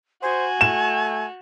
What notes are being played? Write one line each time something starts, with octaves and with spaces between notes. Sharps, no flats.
F#4 C5 G#5
A3 E7